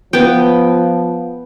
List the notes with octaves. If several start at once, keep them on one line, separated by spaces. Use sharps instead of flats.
F3 B3 G5